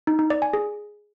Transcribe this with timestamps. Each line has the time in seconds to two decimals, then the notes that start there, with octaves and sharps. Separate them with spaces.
0.07 D#4
0.19 D#4
0.30 D5
0.42 G#5
0.53 G#4